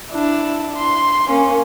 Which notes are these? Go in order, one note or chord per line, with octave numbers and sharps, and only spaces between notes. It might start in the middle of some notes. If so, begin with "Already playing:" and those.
D4 E4
C6
A#3 C#4